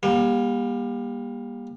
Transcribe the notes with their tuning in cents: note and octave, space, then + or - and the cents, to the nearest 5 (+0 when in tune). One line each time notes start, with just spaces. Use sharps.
G3 +25 A#3 +40